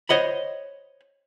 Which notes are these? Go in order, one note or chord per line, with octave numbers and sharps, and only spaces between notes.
C5 C#5 D#5 F#5 B5